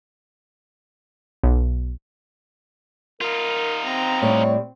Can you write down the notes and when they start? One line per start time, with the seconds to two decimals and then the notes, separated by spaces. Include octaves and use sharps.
1.43 B1
3.21 D#4 F4 A#4
3.85 C4 A#5
4.22 A2 G3 C#5 D5